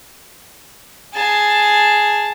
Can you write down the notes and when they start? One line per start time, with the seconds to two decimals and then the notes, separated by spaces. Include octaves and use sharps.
1.14 G#4 A5